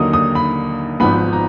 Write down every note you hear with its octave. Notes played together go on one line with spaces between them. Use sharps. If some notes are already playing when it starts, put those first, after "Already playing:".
Already playing: D#2 D3 F#3 A#3 D#4 D#6
D#6
B5
G#1 G#2 F3 B3 B5
A#5